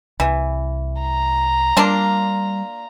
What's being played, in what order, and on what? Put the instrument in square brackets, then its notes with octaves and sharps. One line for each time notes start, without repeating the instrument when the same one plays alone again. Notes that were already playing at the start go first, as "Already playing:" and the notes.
[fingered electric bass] C2 [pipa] E3
[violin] A#5
[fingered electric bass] G3 [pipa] A#3 D4 F4